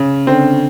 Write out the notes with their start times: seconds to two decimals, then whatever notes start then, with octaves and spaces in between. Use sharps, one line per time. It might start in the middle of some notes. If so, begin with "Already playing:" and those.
Already playing: C#3
0.27 D3 C4